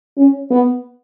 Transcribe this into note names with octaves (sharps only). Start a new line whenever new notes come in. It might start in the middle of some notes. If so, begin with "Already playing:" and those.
C#4
B3